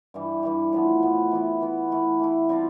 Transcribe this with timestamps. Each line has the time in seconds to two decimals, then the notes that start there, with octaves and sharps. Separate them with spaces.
0.14 G2 E3 G3
0.43 G2 E3 G3
0.73 A2 F3 B3
1.03 A2 F3 B3
1.32 E3 B3 E4
1.61 E3 B3 E4
1.90 E3 A3 E4
2.20 E3 A3 E4
2.49 G3 C4 F4 A4